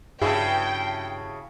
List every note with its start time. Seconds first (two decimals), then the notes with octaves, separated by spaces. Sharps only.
0.22 G2 C#3 E4 F#4 G#4 G5 A5